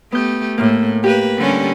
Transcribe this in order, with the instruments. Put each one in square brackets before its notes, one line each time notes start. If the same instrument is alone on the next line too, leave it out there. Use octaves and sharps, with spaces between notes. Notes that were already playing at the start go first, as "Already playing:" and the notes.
[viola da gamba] A3 G4 [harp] B3 G6
[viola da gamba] A2 [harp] A#3
[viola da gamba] A#3 B4 [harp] G4
[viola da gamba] D3 G3 C#4